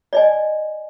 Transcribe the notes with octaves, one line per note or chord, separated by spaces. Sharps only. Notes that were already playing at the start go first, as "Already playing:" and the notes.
D5 D#5 G#5